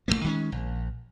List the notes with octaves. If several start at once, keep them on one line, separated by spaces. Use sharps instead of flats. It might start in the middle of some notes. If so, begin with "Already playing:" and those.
A1 D3 A3 A#3
D#3 G#3 A3 C#4
A#1